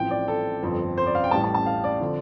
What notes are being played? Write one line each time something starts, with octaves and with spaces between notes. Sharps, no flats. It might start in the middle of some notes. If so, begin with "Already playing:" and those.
Already playing: A1 A2 F3 C4 G5
D5
A4
G1 F2 F3 C4
C5
D5
F5
G5
A1 A2 G3 A5
A5
A5
F5
D5
D3 F3 C4